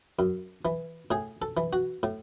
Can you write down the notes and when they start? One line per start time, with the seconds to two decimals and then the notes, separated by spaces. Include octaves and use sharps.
0.19 F#2
0.65 E3
1.11 A2 G#4
1.42 A4
1.57 E3
1.73 F#4
2.03 A2